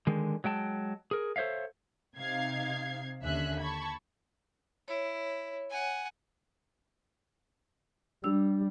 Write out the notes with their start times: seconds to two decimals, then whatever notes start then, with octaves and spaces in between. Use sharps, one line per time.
0.07 D3 D#3 G#3
0.44 F#3 G#3 G5 A5
1.11 G#4 A#4
1.36 A4 C5 C#5 E5 F5
2.17 C3 D#4 F5 G#6 C7
3.23 D#2 D3 C#4 E5 G#5 F#6
3.61 A5 B5 C#6 G#6
4.88 E4 C#5
5.70 F#5 G#5
8.24 G3 D4 E6